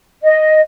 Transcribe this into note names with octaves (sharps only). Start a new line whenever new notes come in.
D#5